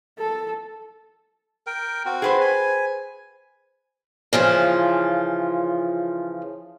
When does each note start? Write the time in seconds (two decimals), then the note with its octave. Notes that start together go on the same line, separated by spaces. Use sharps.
0.19 A4
1.67 A#4 G5
2.06 C4 F#4
2.22 G#4 B4 C5
2.41 G#5
4.33 C#3 E3 F3 F4